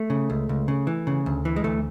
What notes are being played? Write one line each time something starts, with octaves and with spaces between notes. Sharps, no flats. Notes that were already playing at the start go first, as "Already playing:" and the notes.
Already playing: A3
C#3
C#2
C#2
C#3
E3
C#3
D2
E3
G#3
D2 A3